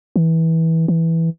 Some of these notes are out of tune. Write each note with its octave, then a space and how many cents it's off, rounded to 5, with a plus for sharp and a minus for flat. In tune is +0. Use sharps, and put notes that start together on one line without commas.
E3 -20
E3 -5